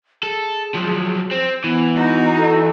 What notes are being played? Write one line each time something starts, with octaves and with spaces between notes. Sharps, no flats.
G#4 A4
F3 F#3
C4
E3 B3
D#4 F#4
A4